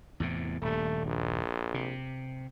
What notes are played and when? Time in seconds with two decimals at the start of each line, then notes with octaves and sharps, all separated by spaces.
0.20 E2 A2 C3
0.62 D#1 G2 A3
1.06 A#1
1.74 C3